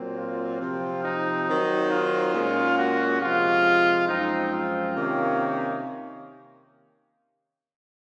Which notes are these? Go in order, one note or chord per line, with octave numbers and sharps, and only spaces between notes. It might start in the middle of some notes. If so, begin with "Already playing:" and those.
Already playing: A#2 F#3 C4
F4
C3 F3 C4
D#4
D#3 F#3 C4
F4
A#2 G#3 C#4
F#4
C3 F3 G#3 F4
F#2 F3 G#3 C4 D#4
F4
C3 D#3 A#3 C#4